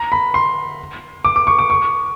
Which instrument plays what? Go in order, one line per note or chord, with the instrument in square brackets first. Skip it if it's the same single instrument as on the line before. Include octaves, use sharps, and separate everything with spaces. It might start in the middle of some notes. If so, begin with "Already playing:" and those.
Already playing: [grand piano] A#5
B5
C6
D6
D6
C#6
D6
C#6